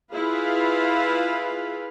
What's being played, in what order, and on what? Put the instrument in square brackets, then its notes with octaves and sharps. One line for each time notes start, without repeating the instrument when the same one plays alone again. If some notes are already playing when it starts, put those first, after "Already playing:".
[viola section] E4 F4 G#4 B4 F5